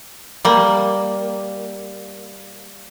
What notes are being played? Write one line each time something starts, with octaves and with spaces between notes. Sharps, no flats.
G3 A#3